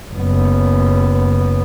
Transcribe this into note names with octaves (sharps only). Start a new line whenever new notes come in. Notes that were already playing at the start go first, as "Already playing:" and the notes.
F#1 B3